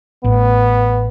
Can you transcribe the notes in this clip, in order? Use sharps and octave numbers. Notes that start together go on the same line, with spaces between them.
A1 A2 B3